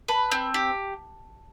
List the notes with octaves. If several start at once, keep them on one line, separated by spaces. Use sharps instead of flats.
B4 A5
C4
G4